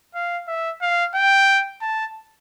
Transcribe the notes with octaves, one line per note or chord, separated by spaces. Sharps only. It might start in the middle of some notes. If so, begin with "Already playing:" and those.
F5
E5
F5
G5
A5